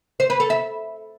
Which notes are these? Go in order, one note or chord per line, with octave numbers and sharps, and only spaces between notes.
C5
B4
A4
E5